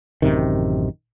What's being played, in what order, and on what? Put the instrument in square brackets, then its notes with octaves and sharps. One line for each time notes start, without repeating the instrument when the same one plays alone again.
[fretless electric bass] A1 F#2 C3 D#3